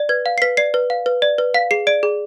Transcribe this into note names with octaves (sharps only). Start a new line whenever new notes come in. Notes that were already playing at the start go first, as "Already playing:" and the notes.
Already playing: D5
B4 G#6
F5
C7
B4 B6
D5 C7
B4
F5
B4
D5
B4
F5 B6
G#4 C7
D5 D7
G#4